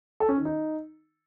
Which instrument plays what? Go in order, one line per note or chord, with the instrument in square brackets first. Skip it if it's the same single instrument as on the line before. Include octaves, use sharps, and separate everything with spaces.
[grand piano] A4
C#4
D#3
D#4